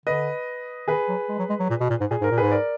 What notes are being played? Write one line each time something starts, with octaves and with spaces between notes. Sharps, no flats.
D3 B4 D#5
D#3 G#4 B4
F#3
G#3
F#3
G#3
F#3
A#2
B2
A#2
G#2
A#2 G#4
G#2
A#4
A#2
G#2 G#4 B4
A#4 D5